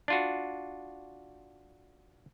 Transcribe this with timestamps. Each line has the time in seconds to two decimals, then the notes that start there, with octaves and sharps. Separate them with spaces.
0.08 D4 F4 F#4